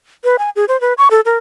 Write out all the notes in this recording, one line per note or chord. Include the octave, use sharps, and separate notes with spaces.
B4
G#5
G#4
C5
B4
C#6
A4
A#4